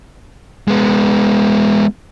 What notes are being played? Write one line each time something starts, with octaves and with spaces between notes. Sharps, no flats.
G#3 B3